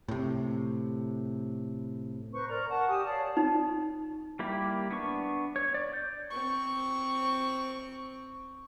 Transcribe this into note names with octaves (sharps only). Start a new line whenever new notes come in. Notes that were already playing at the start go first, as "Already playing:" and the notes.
A2 C3
D#4 B4 C5 C#6
A#4 D5 A#5
F#5 A5 C#6
G4 G#5 D#6
C#5 D5 F5 A5
D#4
G3 A#3 E4 G4
B3 D4 C#6
C#5
D5
G6
C4 C#6